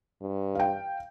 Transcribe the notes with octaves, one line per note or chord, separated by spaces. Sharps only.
G2
F5 G5